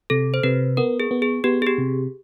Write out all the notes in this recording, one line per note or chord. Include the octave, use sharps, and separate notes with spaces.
C3 A4
C5
C3 B4
B3 A#4
G#4
B3
G#4
B3 G4
G#4
G4
C3